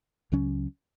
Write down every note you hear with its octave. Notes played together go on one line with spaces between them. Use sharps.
C#2 C#3 F#3 C#4